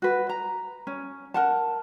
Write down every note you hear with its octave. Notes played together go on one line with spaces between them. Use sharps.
F#4 B4
A#5
C#4
A#4 F#5 A5